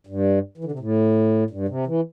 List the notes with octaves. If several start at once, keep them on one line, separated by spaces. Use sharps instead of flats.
G2
E3
D3
C3
A2
G2
C3
E3